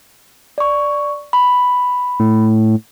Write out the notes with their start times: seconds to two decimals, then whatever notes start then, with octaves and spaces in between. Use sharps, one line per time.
0.58 D5 C#6
1.33 B5
2.20 A2